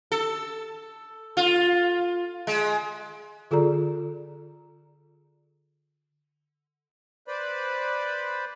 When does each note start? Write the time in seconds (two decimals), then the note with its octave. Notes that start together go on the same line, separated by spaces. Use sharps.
0.12 A4
1.37 F4
2.47 G#3
3.51 D3 F4 G#4 A4 D5 A#5
7.28 B4 C5 D5 B5